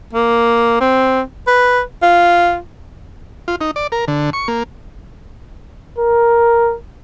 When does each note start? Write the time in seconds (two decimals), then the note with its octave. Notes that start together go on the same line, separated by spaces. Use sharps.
0.13 A#3
0.80 C4
1.47 B4
2.02 F4
3.48 F4
3.61 D#4
3.76 D5
3.92 A#4
4.08 D3
4.33 C#6
4.48 A#3
5.99 A#4